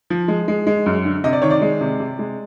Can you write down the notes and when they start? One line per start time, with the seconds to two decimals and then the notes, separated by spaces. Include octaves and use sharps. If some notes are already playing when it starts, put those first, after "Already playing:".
0.10 F3
0.28 G#3
0.48 G#3
0.67 G#3
0.86 F#2
1.05 D3
1.24 C3 D#5
1.33 D5
1.42 D#3 C#5
1.50 D5
1.62 G#3
1.81 C3
2.00 C3
2.19 G#3